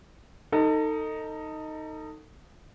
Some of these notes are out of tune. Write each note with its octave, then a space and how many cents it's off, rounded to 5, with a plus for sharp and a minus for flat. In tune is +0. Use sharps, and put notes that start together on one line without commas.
D#4 +0 A4 +30